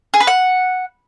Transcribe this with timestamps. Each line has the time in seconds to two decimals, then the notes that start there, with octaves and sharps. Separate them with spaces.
0.14 G#4
0.20 B4
0.27 F#5